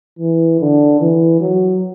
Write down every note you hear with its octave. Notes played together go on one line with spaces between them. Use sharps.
E3
D3
E3
F#3